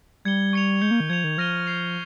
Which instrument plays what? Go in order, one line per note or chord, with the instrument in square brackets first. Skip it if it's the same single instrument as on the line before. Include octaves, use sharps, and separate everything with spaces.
[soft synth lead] G3 [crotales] G#6 C#7 G7
[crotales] C#6 G#6 C#7 F7
[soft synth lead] G#3 [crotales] G6 C#7 G7
[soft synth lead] A#3
D#3
[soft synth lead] F3 [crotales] G#6 C#7 F7
[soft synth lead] D#3
[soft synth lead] F3 [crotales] F6 A#6 D#7 G7
[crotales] G6 C7 F7